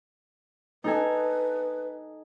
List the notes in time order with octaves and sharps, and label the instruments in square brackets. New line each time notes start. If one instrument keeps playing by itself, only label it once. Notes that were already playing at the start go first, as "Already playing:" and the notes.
[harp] D#4 A4 G#5 [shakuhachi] B4